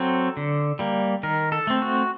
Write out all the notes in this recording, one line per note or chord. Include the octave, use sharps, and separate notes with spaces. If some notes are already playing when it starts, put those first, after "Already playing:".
Already playing: F#3 C4 A4
D3
G3 A#3
D#3 A#4
A4
A3 C4
F#4